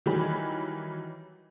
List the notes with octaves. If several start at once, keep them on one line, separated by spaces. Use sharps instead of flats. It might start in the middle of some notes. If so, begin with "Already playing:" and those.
D#3 E3 F#3 G3 G#5 B5